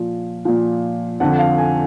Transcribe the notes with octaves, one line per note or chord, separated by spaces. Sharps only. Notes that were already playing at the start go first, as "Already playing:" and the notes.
Already playing: A#2 F3
A#2 F3
F2 D3 F3 F#5
F5
G#5